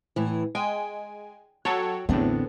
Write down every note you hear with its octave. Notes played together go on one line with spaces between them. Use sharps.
A2 E3
G#3 G5 G#5
F#3 F#4 A4 C#5 G5
A1 E2 A2 D3 B3 C4 D4